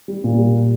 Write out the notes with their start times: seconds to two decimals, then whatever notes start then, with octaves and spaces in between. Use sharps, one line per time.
0.08 G3
0.24 A#2
0.39 G3